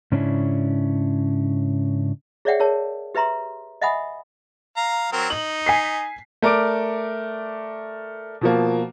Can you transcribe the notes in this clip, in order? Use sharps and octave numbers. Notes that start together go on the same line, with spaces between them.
G#2 C#3 C#4 D4 E4
G#4 C#5 D5 E5 F#5 G5
G#4 A#4 C#5 A5
G4 B4 E5 A#5 C6
D#5 E5 F#5 G#5 B5 D#6
F5 A#5
F#3 C4 A#4
D#4 F#7
G#5 B6 C7
A3 A#4 D5 D6 D7
B2 F3 A#3